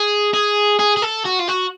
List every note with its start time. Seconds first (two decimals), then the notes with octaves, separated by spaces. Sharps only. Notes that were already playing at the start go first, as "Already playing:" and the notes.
Already playing: G#4
0.34 G#4
0.79 G#4
0.97 G#4
1.02 A4
1.26 F#4
1.40 F4
1.49 F#4